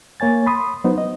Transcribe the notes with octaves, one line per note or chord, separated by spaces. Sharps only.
A#3 C#5 G#5 A6
B5 C6 D#6
F#3 B3 D#4 C5
D#5